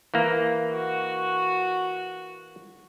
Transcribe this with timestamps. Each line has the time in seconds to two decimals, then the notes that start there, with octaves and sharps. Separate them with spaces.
0.14 E3 A#3
0.72 F#4